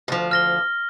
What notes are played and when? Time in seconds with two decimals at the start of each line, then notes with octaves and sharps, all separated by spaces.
0.08 D2 F3
0.31 F6 A#6 G7